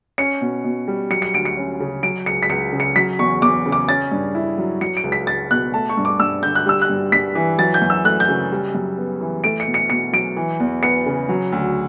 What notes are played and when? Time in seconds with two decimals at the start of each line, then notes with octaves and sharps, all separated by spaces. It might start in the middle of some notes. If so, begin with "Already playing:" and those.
0.18 C#4 C#7
0.41 B2
0.64 B2
0.88 G3
1.10 F#3 C#7
1.22 C#7
1.34 D2 D7
1.45 C#7
1.57 C#4
1.80 C#3
2.03 F#3 D7
2.26 C#2 C#7
2.43 B6
2.49 C#2 C#7
2.73 C#3
2.80 C#7
2.96 F#3 B6
3.19 E2 C#6
3.42 E2 D6
3.66 C#3
3.72 D6
3.88 C#4 A6
4.11 G2
4.35 E4
4.58 F#3
4.81 F#3 C#7
4.97 D7
5.04 C#2
5.12 B6
5.27 C#2 A6
5.51 B2 F#6
5.73 A3 A5
5.89 C#6
5.97 G2
6.05 D6
6.20 G2 E6
6.43 D3 G6
6.55 F#6
6.66 G3 E6
6.82 F#6
6.89 G2
7.12 G2 B6
7.35 E3
7.59 F#3 A6
7.74 G6
7.82 F#2
7.90 E6
8.05 A3 F#6
8.20 G6
8.28 C#3
8.52 G3
8.75 F#2
8.98 B3
9.21 E3
9.44 A3 D7
9.60 C#7
9.67 B2
9.74 C#7
9.90 B2 C#7
10.13 F#3 D7
10.37 E3
10.60 E2
10.83 B3 C#7
11.06 C#3
11.29 F#3
11.52 D2